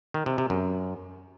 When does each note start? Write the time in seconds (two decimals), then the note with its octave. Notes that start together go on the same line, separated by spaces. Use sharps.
0.14 D#3
0.26 C3
0.38 C3
0.50 F#2